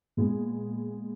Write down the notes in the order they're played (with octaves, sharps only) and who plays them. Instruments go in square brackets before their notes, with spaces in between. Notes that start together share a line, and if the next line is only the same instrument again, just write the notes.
[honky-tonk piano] A#2 G#3 B3